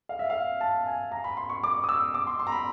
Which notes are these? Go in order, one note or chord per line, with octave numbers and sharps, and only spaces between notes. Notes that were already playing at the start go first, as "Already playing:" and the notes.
F5
E5
F5
A5
G#5
A#5
B5
C6
C#6
D6
D#6
E6
D6
C6
C6
A#5
B5